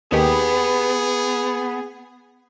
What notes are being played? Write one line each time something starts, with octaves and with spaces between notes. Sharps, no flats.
D#2 D#3 B3 G4 G#4